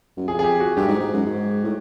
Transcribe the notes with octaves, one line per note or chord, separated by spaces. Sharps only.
F#2
F2 G#4
G#4
G4
F#4
G2 G4
G#2
G#2
F#2
G#2
A2